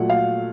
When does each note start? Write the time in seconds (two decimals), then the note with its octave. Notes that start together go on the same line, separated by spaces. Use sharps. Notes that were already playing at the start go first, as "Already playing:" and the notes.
Already playing: A#2 F#3 A3 F#5
0.10 F5